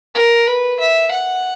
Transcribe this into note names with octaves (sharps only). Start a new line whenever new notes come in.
A#4
B4
E5
F#5